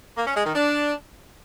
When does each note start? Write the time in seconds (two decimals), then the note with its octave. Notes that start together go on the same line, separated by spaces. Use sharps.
0.17 A#3
0.27 C#4
0.36 G#3
0.46 D#3
0.55 D4